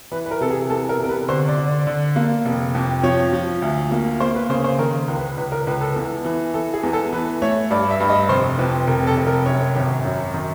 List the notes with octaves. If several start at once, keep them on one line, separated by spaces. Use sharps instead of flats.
E3 B4
B4
A#4
C3 A4
G#4
E2 A4
A#4
C3
A#4
B4
D3 C5
D5
D3
D5
D3
A#3
F1
F2
F3 C#5
F3
D2
A#3
A#3 C5
B4
C#3 C5
C5
D#3 A#4
C#2
B4
C#2 B4
A#4
C#2 B4
A4
E2
E3
E3 A4
G#4
E2
A4
E3 B4
A3 C#5
G2 D5
E5
G2
D#5
F1 C5
F2 B4
F1 A#4
A4
F1
A#4
F#2 C#5
G#1
F#2
D#3